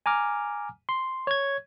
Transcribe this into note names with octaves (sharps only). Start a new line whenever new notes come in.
G#5 A#5 D6 F6
C6
C#5 G#6